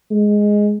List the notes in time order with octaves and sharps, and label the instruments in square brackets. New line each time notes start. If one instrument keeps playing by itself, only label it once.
[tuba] G#3